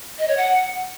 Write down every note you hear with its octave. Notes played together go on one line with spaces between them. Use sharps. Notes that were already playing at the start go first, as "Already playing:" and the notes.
D#5
C#5
F#5